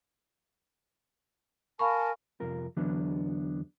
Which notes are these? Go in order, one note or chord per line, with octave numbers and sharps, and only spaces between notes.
A#4 F5 G#5 A5 B5 C#6
C2 F2 F4 A#4
E2 D3 E3 F#3 B3 D4